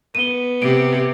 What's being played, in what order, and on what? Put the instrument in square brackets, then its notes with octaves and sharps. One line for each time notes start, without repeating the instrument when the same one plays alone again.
[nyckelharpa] B3 [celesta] D#7 G7
[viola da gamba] C3 [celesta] D7